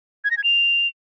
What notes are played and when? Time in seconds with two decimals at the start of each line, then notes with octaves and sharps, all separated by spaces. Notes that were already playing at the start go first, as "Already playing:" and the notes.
0.24 G#6
0.31 A#6
0.37 G#6
0.44 F7